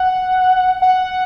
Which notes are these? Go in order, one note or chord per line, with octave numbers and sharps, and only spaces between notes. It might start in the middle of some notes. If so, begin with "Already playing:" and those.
Already playing: F#5
F#5